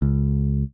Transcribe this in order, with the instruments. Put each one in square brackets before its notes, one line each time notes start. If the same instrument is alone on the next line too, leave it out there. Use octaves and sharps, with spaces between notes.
[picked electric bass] C#2